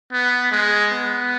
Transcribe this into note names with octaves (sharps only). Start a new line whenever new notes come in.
B3
G#3
B3